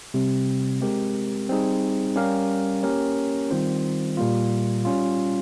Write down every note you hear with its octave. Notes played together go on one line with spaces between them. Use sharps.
C3 G3 C4
G#3 C4 G4 A#4
G3 C4 D#4 G#4
G3 C#4 G4 A#4 F5
A#3 C#4 G4 A#4 C#5
D#3 G3 C4 F4 C5
A#2 G3 A#3 F4
G3 C#4 F4